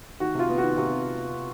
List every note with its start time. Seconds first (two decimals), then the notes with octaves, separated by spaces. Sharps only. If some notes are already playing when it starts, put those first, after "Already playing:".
0.20 D#3 F#4
0.35 C3 F4
0.49 B3
0.58 D#3 F#4
0.77 C3 F#4